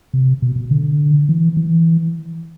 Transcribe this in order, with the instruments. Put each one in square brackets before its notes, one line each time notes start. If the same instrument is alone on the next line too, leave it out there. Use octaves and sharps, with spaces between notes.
[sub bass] C3
B2
B2
D3
E3
E3